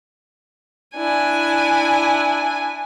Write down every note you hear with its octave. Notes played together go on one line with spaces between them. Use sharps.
D4 E4 G#5